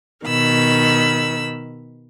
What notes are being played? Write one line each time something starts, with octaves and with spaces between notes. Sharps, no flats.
B2 D#3 B5 E6